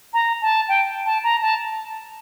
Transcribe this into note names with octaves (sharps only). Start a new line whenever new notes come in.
A#5
A5
G5
A5
A#5
A5